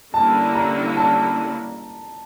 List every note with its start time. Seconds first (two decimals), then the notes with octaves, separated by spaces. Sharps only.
0.14 D3 G3 A#3 C#4 E4 A5
0.55 A#5
0.97 A5